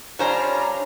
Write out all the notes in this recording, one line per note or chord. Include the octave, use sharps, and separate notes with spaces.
G3 C#4 D4 F4 C5 C#5 A#5